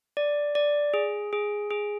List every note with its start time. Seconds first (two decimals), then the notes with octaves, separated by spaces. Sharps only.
0.17 D5
0.55 D5
0.94 G#4
1.33 G#4
1.70 G#4